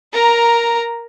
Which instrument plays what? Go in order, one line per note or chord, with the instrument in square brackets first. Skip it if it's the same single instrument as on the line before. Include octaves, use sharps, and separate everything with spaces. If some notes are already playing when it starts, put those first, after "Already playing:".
[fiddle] A#4 A#5